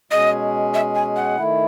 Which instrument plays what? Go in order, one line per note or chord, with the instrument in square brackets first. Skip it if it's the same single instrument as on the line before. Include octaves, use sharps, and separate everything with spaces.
[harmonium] B2 G#3 C#4 G#4 [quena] D#5
[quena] E5
G#5
F#5
[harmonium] D#3 A3 E4